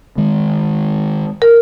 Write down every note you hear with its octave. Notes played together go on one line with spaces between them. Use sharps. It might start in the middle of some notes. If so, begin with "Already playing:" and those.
D#3 G#3
A#4